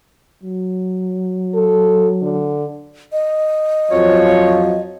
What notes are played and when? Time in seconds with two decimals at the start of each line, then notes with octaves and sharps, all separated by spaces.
0.43 F#3
1.55 A4
2.22 D3
3.12 D#5
3.92 F2 F3 F#3 C#5